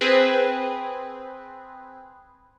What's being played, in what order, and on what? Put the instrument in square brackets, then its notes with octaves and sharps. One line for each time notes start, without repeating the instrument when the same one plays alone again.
[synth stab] C4 G#4 B4